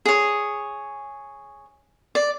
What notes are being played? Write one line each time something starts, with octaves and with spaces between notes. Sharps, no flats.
G#4 C#5
D5